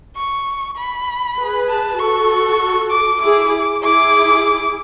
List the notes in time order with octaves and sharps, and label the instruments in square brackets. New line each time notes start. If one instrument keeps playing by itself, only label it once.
[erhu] C#6
B5
[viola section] G#4 B4
[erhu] A5
[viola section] F#4 A4 [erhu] C#6
[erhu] D6
[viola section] E4 G#4 [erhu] D6
[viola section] E4 G#4 [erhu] D6